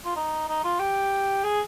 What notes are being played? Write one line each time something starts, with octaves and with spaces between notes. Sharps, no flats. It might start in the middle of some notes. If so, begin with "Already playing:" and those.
F4
D#4
D#4
F4
G4
G#4